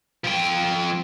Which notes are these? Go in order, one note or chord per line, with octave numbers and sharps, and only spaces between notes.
F3 G5